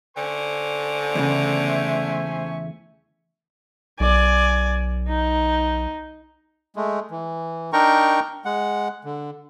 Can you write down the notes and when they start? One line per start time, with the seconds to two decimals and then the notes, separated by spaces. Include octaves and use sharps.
0.17 D3 C5 G#5 C#6
1.15 E2 A#2 C#3 A3 E5
4.00 B1 D5 G#5
5.09 D#4
6.76 G#3 A3
7.11 E3
7.73 D4 D#4 A#4 G5 A#5 C#6
8.45 G#3 F#5
9.05 D3